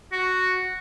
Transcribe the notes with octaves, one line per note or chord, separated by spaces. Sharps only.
F#4